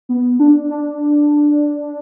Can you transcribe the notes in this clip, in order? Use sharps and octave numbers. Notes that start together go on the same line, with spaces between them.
B3
D4
D4